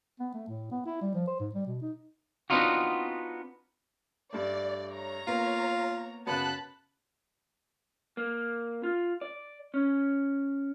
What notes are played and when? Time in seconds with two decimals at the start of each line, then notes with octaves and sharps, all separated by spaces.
0.20 B3
0.34 A3
0.48 A2
0.71 B3
0.86 E4
1.02 G3
1.15 F3
1.28 C5
1.40 G#2
1.55 G3
1.67 B2
1.82 D#4
2.50 B3 C4 D4 D#4 F4 F#4
4.33 G2 A3 D5
4.95 C#5 A#5
5.27 A#3 B3 F4
6.27 F#2 C#3 B3 A5 B5 F#6
8.17 A#3
8.83 F4
9.21 D5
9.74 C#4